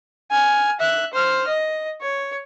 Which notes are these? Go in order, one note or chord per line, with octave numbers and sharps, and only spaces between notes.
G#5 F6
E5 F#6
C5 F6
D#5
C#5